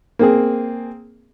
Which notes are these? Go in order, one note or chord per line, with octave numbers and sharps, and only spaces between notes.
A#3 C4 G#4